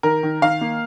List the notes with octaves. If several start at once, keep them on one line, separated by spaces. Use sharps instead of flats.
D#3 A#4
D#3
D#3 F5
A#3